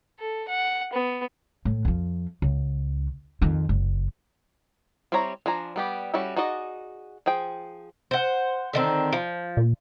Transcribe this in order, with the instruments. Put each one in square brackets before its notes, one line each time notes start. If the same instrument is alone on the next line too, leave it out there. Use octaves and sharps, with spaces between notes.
[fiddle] A4
F#5
B3
[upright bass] A2
F2 F3
C#2
F2 D#3
F#1
[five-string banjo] G3 C4 E4 C#5 A#5
F3 D4 G#5 A#5
G3 B3 G4
G3 C#4 E4 F#4 A4
D#4 F#4 G#4 D5 D#5
F3 G#4 G5
[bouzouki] C5 F#5
D3 D#3 C4
F3
[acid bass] A#2